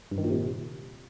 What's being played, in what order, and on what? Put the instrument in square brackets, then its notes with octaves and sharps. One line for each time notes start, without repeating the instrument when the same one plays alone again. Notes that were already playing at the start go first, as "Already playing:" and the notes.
[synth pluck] G2
D#3
A#2
C3